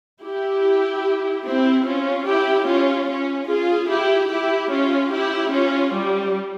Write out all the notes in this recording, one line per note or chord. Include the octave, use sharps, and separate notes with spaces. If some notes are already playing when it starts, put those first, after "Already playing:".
E4 G4
C4 E4
C#4 F4
E4 G4
C#4 F4
C#4
F4 G#4
E4 G4
E4 G4
C#4 F4
E4 G4
C#4 F4
G3